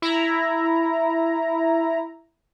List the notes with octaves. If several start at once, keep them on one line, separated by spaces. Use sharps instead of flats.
E4 A#5